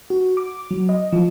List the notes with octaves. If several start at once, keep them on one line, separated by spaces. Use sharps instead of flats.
F#4
D6
F#3
D#5
F3